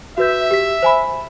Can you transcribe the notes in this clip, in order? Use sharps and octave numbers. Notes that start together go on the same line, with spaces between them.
F#4 B4 E5 G6
G4 B6
C5 G#5 B5